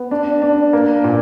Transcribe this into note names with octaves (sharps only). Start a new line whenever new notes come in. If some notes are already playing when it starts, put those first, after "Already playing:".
Already playing: B3
D4
D4
A#3
A#2